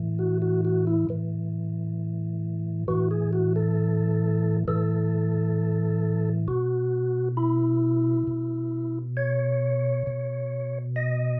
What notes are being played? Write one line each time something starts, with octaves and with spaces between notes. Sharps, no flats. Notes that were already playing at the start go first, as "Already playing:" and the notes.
Already playing: A2 E3
F#4
F#4
F#4
E4
A2 E3
A2 E3 F#4
G#4
F#4
A4
A2 E3 A4
B2 F#4
E4
B2
C#5
B2
D#5